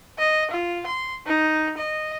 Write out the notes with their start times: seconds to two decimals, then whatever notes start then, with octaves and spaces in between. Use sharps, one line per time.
0.18 D#5
0.51 F4
0.86 C6
1.26 D#4
1.77 D#5